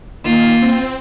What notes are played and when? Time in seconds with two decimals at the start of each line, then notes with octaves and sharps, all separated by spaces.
0.25 D#3 A#3 F4
0.62 C4